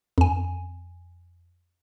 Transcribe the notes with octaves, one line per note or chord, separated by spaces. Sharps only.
F2 G#5